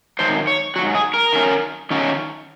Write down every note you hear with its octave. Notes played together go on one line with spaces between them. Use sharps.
G#2 D#3 F#3 C5
C#5
G#2 D#3 F#3 F#4
G#4
A#4
D#3 F#3 C#4
D#3 F#3 C#4